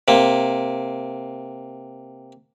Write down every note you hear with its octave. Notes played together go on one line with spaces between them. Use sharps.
C3 A#3